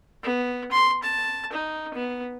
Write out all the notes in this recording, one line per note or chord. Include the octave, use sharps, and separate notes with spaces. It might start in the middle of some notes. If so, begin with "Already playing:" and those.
B3
C6
A5
D#4
B3